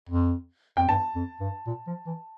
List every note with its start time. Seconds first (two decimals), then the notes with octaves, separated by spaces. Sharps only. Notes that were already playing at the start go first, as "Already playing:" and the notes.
0.09 F2
0.77 F2 G5
0.88 G2 A5
1.15 F2
1.40 G2
1.67 A#2
1.87 F3
2.07 E3